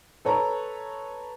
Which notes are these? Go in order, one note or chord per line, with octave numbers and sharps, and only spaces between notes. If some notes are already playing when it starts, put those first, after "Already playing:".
A4 B4 C#5 A#5